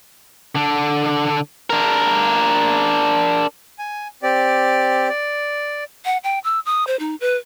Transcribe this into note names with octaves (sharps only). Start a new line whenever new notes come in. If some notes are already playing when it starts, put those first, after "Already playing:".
D3 D4
D4 A#4
G#5
C4 G4 D5
D5
F#5
G5
E6
D#6
C5
D#4
B4